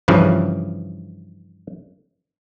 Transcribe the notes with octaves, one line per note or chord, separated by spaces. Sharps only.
G2 C#3 E3 F3